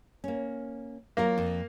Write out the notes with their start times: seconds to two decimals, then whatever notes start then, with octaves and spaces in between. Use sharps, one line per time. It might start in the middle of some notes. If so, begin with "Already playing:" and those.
0.24 A#3 C#4
1.17 F#3 A#3 F4 A#4
1.38 F2